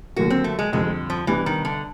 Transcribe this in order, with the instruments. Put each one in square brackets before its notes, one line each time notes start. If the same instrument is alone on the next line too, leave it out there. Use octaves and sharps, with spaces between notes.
[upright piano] D#2 D3 F#3 A#3 [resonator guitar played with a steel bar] F#4
[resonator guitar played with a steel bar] C4
A3
G#3
[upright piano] F2 D3 G3 C4 [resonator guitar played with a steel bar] G#3
[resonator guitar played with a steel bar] F3
[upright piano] C2 B2 G3 B3 D4 [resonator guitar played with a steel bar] E3
[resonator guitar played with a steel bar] D#3
D3